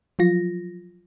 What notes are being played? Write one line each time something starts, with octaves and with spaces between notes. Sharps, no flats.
F3 F#3 F4 A#6